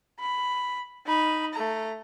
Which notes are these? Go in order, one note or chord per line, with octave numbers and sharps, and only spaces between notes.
B5
D#4 B5
A3 A#5